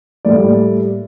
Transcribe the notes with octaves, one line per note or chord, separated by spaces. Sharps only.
A2 G3 A#3 D5